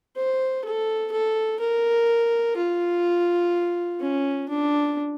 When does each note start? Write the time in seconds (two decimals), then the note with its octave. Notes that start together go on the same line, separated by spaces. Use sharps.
0.16 C5
0.65 A4
1.12 A4
1.60 A#4
2.56 F4
4.00 C#4
4.49 D4